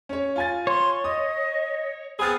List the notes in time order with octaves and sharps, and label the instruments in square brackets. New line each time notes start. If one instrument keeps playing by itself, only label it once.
[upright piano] C#4 C#5
F4 G#5 A6
[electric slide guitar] C#5 [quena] C6
[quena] D#5 [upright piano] D#6
[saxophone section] B3 C4 G#4 [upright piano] B5 F6 A6